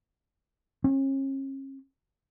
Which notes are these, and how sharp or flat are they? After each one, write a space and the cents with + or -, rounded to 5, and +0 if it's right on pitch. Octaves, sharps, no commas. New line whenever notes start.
C#4 -40